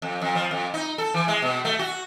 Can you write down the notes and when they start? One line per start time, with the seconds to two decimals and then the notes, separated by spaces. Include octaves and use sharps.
0.02 F2
0.22 F2
0.35 F3
0.51 F2
0.74 D#4
0.98 A4
1.14 E3
1.28 G#3
1.42 B2
1.65 A3
1.79 F#4